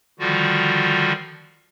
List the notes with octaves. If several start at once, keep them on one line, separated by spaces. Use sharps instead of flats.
D3 D#3 F3 G3 F4 F#4